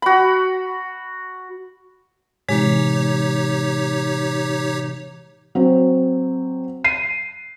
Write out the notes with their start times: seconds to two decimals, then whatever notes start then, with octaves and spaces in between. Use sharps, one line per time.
0.02 F#4 B5
2.49 A2 C3 E3 G#3 D#4 G4 C#5
5.55 F#3 C4
6.84 C7 D#7